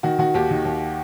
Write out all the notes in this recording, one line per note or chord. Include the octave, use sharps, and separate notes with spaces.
D#3 F#4
D#3 F#4
D#2 G4
D#3
D#2